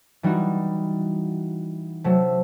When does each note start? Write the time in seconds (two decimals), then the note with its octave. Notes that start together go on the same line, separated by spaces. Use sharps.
0.23 E3 G3 D#4 F#4
2.04 C3 F#3 A3